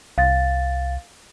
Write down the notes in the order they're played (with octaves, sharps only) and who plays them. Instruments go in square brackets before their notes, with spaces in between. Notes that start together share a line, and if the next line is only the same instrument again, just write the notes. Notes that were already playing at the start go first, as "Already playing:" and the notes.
[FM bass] C2 [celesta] F5 A6